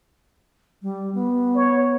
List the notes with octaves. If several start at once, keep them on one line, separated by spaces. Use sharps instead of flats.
G3
B3
C#5